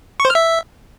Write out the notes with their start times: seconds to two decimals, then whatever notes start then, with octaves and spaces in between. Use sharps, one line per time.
0.20 C#6
0.25 C5
0.30 F6
0.35 E5